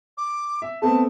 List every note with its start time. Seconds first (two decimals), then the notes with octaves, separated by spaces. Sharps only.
0.18 D6
0.62 E5
0.82 A3 B3 C4 A5